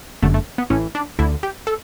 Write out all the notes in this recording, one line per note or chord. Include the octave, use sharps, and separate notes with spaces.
G1 F#2 D3 A3
A3
B3
A1 A2 E3 C#4
D4
D2 D3 E4
G4
A4